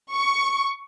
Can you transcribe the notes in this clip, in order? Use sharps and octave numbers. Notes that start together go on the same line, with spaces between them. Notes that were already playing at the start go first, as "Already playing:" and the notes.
C#6